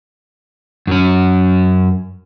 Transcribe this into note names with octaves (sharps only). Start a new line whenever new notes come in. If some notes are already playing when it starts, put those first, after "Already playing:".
F#2 C#4